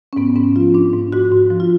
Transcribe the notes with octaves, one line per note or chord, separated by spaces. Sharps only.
C#4
G#2 B3
G#2 C#4
F3 F4
G#2 D4
G#2
G#2 F#4
G#2
F3
F4